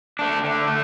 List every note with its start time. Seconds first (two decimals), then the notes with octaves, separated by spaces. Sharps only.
0.19 A3 D4
0.44 D3
0.68 A3